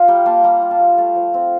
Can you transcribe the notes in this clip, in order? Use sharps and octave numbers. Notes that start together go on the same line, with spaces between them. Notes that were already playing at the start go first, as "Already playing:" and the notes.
Already playing: F4 F5
G3 G5 A#5
A#3 A5 C6
G3 G5 A#5
F4
F5 A5
G3
A3 F5 A5
F3
C4